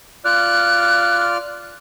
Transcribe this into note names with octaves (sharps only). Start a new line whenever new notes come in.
F4 D5 F6 F#6